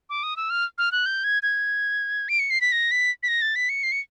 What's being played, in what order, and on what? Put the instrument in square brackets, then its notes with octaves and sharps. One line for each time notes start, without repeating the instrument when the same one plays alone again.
[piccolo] D6
D#6
E6
F6
F6
F#6
G6
G#6
G#6
D7
C#7
C7
B6
A#6
B6
B6
A#6
A6
B6
C#7
C7
C#7